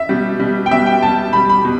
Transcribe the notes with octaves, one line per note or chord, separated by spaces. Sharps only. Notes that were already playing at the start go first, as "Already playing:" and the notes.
Already playing: E5
B2 G3
B2 G3
G5
B2 G3 E5
G5
B2 G3 A5
B2 G3 B5
B5
B2